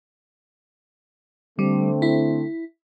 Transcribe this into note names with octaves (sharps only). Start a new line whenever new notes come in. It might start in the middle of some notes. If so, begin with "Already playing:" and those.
D3 G3 A3 C4
E4